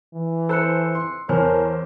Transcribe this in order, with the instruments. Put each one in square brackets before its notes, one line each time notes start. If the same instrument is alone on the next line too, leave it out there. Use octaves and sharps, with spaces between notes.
[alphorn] E3
[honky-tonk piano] A4 C5 [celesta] E6 F#6 C#7
[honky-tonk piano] C6
[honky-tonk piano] E2 C5 F6 [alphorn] A#4 [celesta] C#5 G#5 A5